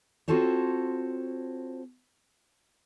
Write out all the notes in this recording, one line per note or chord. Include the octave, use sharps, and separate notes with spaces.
C4 F4 F#4 A4 C5 C#5